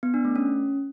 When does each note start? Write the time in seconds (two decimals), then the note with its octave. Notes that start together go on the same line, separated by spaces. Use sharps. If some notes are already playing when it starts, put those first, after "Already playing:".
0.03 B3
0.14 D4
0.25 A3
0.36 C#4